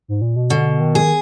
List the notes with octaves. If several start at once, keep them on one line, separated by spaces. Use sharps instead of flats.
G#2
A#2
B2
B2 D3
D#3
G#4